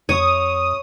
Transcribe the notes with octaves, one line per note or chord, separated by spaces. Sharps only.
F2 C#5 D#6